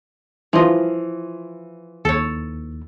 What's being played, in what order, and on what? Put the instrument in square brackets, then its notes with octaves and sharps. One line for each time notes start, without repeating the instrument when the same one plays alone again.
[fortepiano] E3 F4 [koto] F3 D#5
[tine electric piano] D#2 [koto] A4 C#5